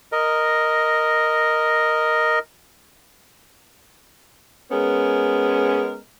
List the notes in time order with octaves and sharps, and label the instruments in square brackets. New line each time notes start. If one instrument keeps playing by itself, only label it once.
[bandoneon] A#4 D#5
[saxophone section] G#3 B3 C#4 A#4